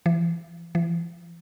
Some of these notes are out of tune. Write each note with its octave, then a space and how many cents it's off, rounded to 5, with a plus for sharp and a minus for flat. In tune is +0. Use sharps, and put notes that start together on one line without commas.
E3 +40
E3 +45